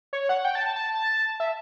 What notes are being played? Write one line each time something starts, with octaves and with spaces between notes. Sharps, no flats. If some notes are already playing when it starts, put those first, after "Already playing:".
C#5
F#5
G5
A5
A5
A5
E5